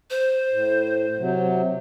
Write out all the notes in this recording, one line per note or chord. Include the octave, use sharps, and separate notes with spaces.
C5
A2
C3 F#3